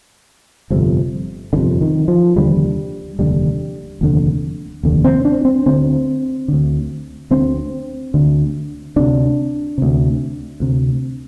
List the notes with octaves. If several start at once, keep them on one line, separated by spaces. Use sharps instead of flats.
G1 F2 C3
G1 F2 C3 D3
D#3
F3
F1 D#2 D3 G3
F1 D#2 D3 G3
F1 D#2 D3
F1 D#2 D3
C4
D4
C4
D2 D3 C4
D2 D3
D2 D3 C4
D2 D3
D2 C3 D4
D2 C3
D2 C3